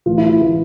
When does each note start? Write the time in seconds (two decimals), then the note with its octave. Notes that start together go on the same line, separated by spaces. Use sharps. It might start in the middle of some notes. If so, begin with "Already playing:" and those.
0.06 A2 E3 F4
0.18 E4
0.29 F4
0.40 A2 E3 E4